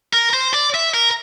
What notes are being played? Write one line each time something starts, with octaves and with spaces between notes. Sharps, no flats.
A#4
C5
D5
E5
A#4